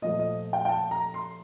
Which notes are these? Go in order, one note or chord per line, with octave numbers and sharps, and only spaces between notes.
A#2 F3 A3 D#5
D#5
G5
G5
A5
A#5
C6